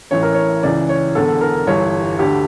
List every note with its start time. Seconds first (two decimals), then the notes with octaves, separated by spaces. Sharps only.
0.11 A1 A2 E3 C#5
0.23 A#4
0.34 C#5
0.63 C#2 C#3 E3 D5
0.89 C#5
1.15 E1 E2 D3 A4
1.41 A#4
1.67 G1 G2 E3 C#5
2.19 D2 D3 G4